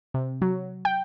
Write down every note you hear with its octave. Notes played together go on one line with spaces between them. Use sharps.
C3
F#3
G5